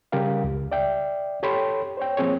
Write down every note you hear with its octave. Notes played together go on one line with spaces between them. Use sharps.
C#3 G3 G4 A#4 F5
C#2
D5 E5 G5
G4 A4 C#5 G5 B5 C6
C5 C#5 G5
F3 A#3 C4 G#4 C#5